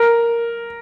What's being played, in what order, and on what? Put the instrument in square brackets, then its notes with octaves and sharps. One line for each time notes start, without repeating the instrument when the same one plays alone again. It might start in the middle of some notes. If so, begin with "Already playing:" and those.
Already playing: [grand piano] A#4